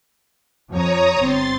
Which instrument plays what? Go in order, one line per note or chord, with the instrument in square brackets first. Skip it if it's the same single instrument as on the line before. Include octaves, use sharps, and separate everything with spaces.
[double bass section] F2 F3 [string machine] C#5 A#5 D#6
[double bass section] G1 C4 [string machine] C6 A6